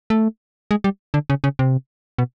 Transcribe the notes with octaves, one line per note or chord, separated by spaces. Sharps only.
A3
G#3
G3
D3
C#3
C#3
C3
B2